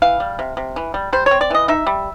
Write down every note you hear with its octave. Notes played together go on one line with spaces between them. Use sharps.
E3 F5
G3
C3
C3
E3
G3
G3 C5
C#5
C4
D5
E3 D#5
D#4 E5
G3